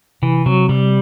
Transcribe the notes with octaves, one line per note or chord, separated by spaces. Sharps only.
C3 E3
C3 F#3
C3 G3